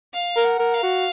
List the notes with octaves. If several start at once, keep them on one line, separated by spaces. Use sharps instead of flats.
F5
A#4
F#5
A#4
F5
F#4